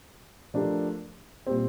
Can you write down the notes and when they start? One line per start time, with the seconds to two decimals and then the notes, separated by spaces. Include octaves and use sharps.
0.54 F3 A3 D4 G4 A#4
1.47 A#2 G3 C4